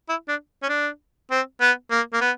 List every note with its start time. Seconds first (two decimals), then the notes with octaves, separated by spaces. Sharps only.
0.09 E4
0.29 D4
0.63 C#4
0.69 D4
1.31 C4
1.61 B3
1.91 A#3
2.13 A#3
2.21 B3